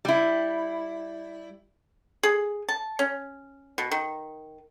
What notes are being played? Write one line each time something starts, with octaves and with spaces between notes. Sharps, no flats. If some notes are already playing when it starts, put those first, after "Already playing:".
G3 E4
G#4
A5
C#4
B2
D#3